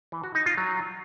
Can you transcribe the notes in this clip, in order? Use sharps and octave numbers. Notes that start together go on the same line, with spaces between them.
E3
F#4
D#4
F4
F#3